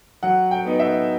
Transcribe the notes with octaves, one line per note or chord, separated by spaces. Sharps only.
F#3 F#5
G5
B3 D#4
E5